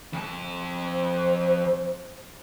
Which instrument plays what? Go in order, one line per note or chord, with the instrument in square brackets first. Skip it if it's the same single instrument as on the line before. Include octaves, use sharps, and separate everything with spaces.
[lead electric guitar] F2 A5
[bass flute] C5